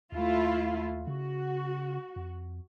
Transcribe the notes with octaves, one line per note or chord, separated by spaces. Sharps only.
D#2 A3 E4 F4
C#3 F#4
F2